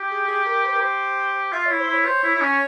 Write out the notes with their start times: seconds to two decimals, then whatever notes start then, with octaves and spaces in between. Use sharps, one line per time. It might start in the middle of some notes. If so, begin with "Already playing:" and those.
Already playing: G4
0.11 G#4
0.28 G#4
0.46 A#4
0.64 C5
0.72 A#4
0.80 G4 C5
1.52 F4 E5
1.66 E4 C#5
1.80 C5
1.88 E4
1.94 C#5
2.06 C5
2.24 E4
2.35 E4
2.41 C#4